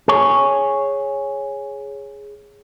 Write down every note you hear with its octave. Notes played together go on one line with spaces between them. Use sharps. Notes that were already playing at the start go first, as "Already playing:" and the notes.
G#4 C#5